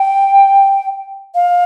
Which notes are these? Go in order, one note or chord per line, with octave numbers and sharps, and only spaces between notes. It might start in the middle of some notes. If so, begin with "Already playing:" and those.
Already playing: G5
F5